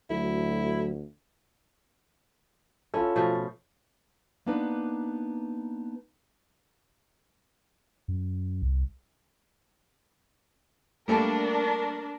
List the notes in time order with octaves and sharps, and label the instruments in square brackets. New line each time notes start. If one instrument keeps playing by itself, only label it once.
[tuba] D2 [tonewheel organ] F#3 A3 [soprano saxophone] E4
[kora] C#4 E4 [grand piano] F4 A4
[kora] B2 F3 A3
[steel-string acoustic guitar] A#3 B3 D4 D#4 B4
[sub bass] F#2
C2
[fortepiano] G3 A3 A#3 [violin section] D4 A#4